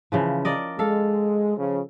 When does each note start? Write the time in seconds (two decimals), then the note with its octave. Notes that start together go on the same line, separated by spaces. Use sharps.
0.12 C#3 E3 F3
0.45 A#4 D5 D#5
0.79 G#3 A4 F5
1.57 C#3 F3